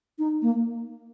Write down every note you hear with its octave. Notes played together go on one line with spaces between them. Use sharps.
D#4
A#3